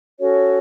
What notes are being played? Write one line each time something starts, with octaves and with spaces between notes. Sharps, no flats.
C#4 F#4 A4 C#5